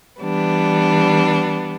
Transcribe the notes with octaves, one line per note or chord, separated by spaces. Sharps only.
E3 G3 B3 D4